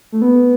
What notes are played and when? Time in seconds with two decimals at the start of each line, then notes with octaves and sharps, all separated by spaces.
0.12 A3
0.22 B3